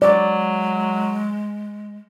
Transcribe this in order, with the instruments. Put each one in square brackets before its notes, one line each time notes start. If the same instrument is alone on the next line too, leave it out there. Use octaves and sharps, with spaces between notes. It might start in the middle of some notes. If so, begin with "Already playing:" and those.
[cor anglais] F#3 [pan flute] G#3 [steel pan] D5